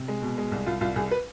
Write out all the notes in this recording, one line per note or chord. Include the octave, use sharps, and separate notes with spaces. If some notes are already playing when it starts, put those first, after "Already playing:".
Already playing: C3
G#3
B2
G#3
C2
C2 F4
C2 F4
C2 G#4
B4